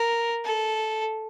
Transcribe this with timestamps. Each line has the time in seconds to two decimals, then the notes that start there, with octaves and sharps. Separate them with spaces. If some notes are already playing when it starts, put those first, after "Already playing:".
Already playing: A#4
0.45 A4